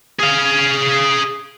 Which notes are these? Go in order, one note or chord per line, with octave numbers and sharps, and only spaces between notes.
G#4 F5